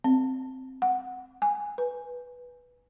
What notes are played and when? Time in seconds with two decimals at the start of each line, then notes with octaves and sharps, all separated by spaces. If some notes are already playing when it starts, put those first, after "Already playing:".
0.04 C4
0.82 F#5
1.42 G#5
1.78 B4